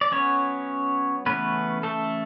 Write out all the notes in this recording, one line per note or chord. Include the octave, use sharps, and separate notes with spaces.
D5
F#3 B3 C#4 C#5
C#3 E3 A3 B3 C#4 B4
A3 A4